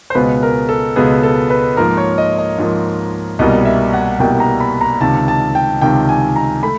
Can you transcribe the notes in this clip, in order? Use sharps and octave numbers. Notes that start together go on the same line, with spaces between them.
C5
C#2 B2 G#3 B3 B4
A#4
A4
C#2 B2 G#3 B3 G#4
A4
B4
G#2 F3 A#3 A#4
C#5
D#5
D#5
G#2 F3 A#3
C2 B2 G3 A#3 D#5
E5
F#5
C2 B2 G3 A#3 G5
A#5
B5
A#5
C#2 C3 D#3 A5
A5
G5
C#2 C3 D#3 G5
G#5
A#5
A3 B5